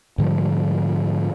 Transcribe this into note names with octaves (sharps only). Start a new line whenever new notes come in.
G#2 D3 F3 G3